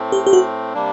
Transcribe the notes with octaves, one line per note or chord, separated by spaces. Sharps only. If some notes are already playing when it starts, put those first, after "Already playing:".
Already playing: A2 A3 C4
G4
G4
F#4
C3 G3 A#3 D4